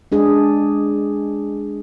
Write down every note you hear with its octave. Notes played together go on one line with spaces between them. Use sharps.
G#3 D4 G#4